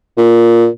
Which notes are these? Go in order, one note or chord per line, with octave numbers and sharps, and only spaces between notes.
A#2